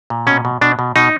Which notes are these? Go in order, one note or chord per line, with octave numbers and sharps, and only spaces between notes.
A#2
B2 C#4
B2
B2 D4
B2
B2 D#4